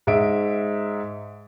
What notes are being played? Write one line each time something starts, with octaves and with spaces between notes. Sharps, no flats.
G#2 E5 D7